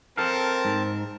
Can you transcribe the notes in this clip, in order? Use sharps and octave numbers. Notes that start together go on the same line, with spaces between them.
C4 G4 A4 A#4 F5 A5
G#2